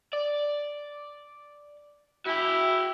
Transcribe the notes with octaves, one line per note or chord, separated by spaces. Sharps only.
D5
E4 F#4 G5